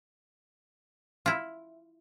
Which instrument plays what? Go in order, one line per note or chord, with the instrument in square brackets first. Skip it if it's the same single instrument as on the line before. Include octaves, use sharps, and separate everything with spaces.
[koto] E4 F4